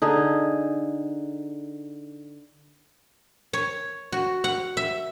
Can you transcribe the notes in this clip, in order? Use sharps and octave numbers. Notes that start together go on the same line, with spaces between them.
D3 D#4 G#4
C#5
F#4
F#5
E5